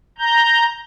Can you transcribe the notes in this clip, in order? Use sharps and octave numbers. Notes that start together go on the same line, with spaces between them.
A#5 G6